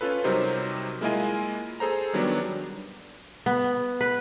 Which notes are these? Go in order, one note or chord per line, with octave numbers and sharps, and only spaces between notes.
C#4 F4 A4 B4
C3 F#3 G3 D#4 A#4 C5
G#3 A#3 E4 F4 D#5 G#5
G#4 A4 C5 A#5
D#3 F#3 G3 B3 D4
B3
B4